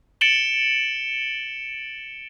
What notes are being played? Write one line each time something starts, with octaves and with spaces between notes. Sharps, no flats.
A6 C#7 D7 E7 F#7 G7